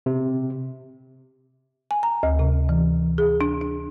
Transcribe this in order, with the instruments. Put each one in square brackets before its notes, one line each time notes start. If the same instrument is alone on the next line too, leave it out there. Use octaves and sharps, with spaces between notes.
[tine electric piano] C3
[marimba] G#5
A#5
D2
C3
E3
G#4
D4
D4